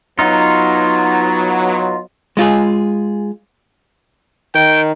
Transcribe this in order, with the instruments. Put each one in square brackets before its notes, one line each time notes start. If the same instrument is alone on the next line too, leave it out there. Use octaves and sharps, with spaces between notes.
[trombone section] F#3 B3 [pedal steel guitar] D#4 F4
[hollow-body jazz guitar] G#3 F4 G#4
[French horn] D#3 [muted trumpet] G5